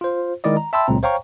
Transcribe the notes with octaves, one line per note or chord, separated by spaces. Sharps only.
F4 C5
D#3 G#3 E4 D5 D#5
A#5
E5 G5 A5 B5 C6 E6
C#2 A#2 F#3 C4 A#5
C5 C#5 F5 G5 A#5 C#6